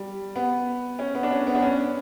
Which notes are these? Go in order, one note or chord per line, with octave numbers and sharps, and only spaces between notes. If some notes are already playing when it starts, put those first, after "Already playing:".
Already playing: G3
B3
C#4
B3
D4
C#4
B3
D4
C#4